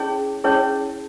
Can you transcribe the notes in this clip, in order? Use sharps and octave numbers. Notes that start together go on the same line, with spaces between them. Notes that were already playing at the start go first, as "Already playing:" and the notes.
Already playing: C#4 E4 G#4 C#5
C#4 E4 G#4 C#5